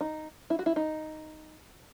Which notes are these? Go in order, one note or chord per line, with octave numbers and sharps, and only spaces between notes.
D#4
E4
F#4
E4
D#4